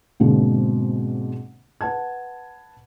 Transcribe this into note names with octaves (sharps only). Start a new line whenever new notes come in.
G#2 B2 D3 A#3 C4
B4 F#5 A5 G#6